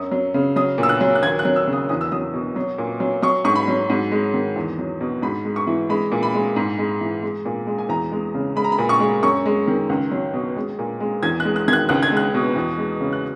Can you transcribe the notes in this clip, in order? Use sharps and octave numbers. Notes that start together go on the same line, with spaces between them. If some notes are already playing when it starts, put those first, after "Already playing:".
Already playing: F#2 D#6
F#3
C#3
F#3 D#6
A#2
E6
F#6
F#3
F#6
D#2 G#6
F#6
F#3
E6
C#3
D#6
E2 D#6
E6
F#3 D#6
B2
F#3
A#2
F#3
F#3 C#6
G#2 C#6
B5
F#3
G#2
G#3
D#3
E2
F#3
B2
G#2 B5
G#3
C#6
E3
G#3 B5
A#2
B5
G#3
G#2
G#3
E3
G#3
A#2
G#3
G#5
E2 A#5
G#3
C#3
G#3 B5
A#5
B5
A#2
C#6
G#3
F#2 C#6
G#3
D#3
C#2
F#3
B2
G#3
A#2
G#3
E2 G#6
G#3 F#6
F#6
D#3 G#6
F#6
C#2 F#6
G#6
G#3 F#6
B2
E2
G#3
C#3
F#6